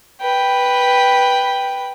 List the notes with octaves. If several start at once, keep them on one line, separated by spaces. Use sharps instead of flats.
B4 G5